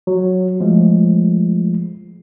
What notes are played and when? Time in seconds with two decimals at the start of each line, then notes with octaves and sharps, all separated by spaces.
0.07 F#3
0.60 F3 G#3 A3